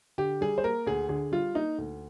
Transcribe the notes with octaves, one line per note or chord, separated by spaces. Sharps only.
D3 G4
G3 G#4
C5
A#3 A#4
D2 G#4
D3 G#4
G3 F4
A#3 D#4
D2